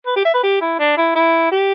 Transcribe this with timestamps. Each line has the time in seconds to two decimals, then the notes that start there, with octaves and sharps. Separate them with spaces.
0.06 B4
0.16 G4
0.25 E5
0.34 B4
0.43 G4
0.61 E4
0.79 D4
0.97 E4
1.15 E4
1.52 G4